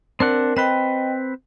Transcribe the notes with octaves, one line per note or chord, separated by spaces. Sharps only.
C4 D4 A#4 F#5
C4 B4 D#5 G5